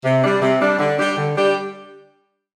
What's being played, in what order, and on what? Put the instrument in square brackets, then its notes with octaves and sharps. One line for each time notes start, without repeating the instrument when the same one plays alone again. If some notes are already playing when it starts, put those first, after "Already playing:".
[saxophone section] C3
G3 D4
C3
G3 D4
D3
G3 D4 G4
D3
G3 D4 G4